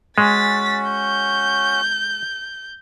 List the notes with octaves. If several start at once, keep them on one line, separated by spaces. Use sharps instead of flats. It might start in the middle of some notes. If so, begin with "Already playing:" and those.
G#3 C#4 F#4 A6 B6
G6